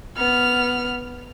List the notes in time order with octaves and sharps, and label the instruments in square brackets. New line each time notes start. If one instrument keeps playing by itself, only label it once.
[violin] B3 F6